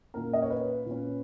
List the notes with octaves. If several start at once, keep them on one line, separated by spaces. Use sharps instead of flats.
A#2 A#3 C#4 A#4
D#5
C#5
B4
A#2 A#3 C#4